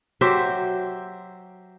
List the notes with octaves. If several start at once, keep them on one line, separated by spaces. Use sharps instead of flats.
F#3 G4 C5 E5